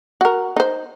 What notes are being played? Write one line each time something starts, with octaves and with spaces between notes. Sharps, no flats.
F#4 A#4
D#4 C5